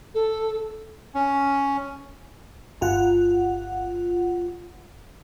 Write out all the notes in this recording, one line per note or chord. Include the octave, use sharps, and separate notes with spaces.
A4
C#4
G1 F4 F#5